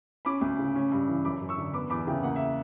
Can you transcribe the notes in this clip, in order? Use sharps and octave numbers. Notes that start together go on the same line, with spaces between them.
C#4 B5 D6
D2
C#3
C#4
G2
E3
F#2 B5 D6
F#2
C#6 E6
D3
B3 B5 D6
E2 B5 D6
C#3 E5 G5
A#3 F#5
E5